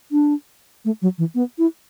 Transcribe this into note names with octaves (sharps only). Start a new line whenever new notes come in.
D4
A3
F#3
E3
B3
E4